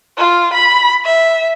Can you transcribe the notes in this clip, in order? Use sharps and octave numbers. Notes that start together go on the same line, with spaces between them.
F4
B5
E5